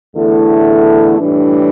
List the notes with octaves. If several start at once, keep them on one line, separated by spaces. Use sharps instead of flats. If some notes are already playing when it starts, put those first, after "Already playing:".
E2 D3 A3 E4 A4
A2 E3 G3 D4